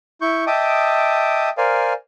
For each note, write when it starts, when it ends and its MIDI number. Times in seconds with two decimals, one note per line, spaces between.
0.21 0.44 64
0.21 0.44 85
0.21 0.44 91
0.47 1.50 75
0.47 1.50 76
0.47 1.50 79
0.47 1.50 81
0.47 1.50 86
0.47 1.50 87
1.58 1.93 70
1.58 1.93 72
1.58 1.93 74
1.58 1.93 77
1.58 1.93 80